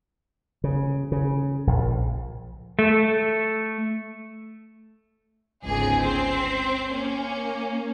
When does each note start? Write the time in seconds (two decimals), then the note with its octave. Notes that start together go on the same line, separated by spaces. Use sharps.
0.64 C#3
1.12 C#3
1.67 A#1
2.79 A3
5.64 G1 C#2 G#2 G#4
6.02 C4 C7
6.90 A#3 C#4